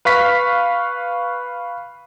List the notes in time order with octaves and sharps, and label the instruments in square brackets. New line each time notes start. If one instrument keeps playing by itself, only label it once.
[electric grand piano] B4 F5 C#6 B6